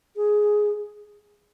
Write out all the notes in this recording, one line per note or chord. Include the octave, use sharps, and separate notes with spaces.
G#4